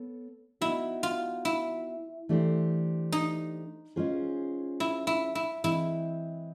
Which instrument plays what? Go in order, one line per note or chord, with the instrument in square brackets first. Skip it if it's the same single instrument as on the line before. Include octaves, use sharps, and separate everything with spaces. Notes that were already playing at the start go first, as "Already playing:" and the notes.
Already playing: [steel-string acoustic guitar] B3 A4 C#5
[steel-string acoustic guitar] B3 D#4 F#4 [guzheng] E4
[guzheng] F4
E4
[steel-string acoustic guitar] E3 A3 D4 G4 C5
[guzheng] D#4
[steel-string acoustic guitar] G#3 C#4 F4 G#4 C5
[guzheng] E4
E4
E4
[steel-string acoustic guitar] E3 G#3 C4 [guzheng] E4